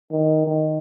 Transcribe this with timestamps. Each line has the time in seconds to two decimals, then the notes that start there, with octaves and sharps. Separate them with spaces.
0.11 D#3
0.47 D#3